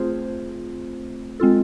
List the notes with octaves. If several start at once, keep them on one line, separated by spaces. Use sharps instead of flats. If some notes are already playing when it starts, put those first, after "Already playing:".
Already playing: A3 C4 F4 G#4 C5
G#3 C4 F4 A4